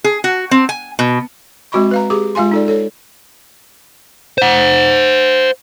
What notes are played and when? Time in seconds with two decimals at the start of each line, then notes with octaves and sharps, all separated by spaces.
0.04 G#4
0.24 F#4
0.51 C4
0.69 G#5
0.99 B2
1.72 G#3 C4 F#4 D#5 B5 C#6
1.91 B4 F5 A#5
2.10 G4 G#4 D6
2.35 G#3 F4 F5 G#5 C6
2.51 D#4 A4 D5
2.68 A4 C#5
4.38 C5 F#5